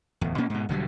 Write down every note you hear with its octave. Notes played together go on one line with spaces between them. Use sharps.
D1 E2
B2 A#3 C#4
G#2 B2
E1 D3 F#3 G3